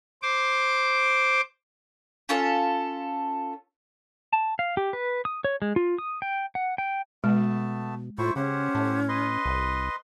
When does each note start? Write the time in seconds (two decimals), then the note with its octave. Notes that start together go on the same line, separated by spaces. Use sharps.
0.22 C5 D6
2.29 C#4 F4 A4 C#5
4.33 A5
4.59 F5
4.77 G4
4.93 B4
5.25 D#6
5.44 C#5
5.62 G#3
5.76 F4
5.98 D#6
6.22 G5
6.55 F#5
6.78 G5
7.24 B2 G#3 A3 B3 A5
8.18 A2 E4 F4 C5 C#6
8.36 C#3 C#4 G4 C5 F#5
8.75 A2 A5
9.09 B4 D#5 C6
9.45 C2